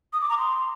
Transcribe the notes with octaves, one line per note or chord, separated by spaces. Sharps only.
D#6
D6
A#5
C6